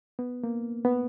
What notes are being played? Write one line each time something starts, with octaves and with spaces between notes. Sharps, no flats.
B3
A#3
B3